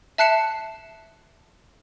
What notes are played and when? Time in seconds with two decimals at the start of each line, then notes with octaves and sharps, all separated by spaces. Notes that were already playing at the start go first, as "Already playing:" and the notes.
0.18 E5 A5 F#6 C7 C#7 E7